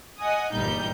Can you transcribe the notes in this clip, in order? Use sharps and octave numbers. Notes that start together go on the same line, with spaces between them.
D#5 F#5 G#5 D#6
G1 E2 A#2 G3 D#4 G6